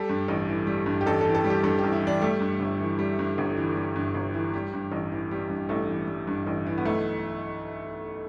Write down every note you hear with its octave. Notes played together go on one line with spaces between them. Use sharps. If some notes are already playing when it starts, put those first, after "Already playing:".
Already playing: G3 A4
G2
A1
E3
G3
G2
G4
A1 A4
A4
E3
A4
G3
G4
G2 A4
G4
A1
E4
E3 D4
G3 A3
G2
G1
E3
G3
G2
G1
E3
G3
G2
G1
E3
G3
G2
A1
E3
G3
G2
A1 A3
E3
G3
G2
A1
E3
B3
B1 A3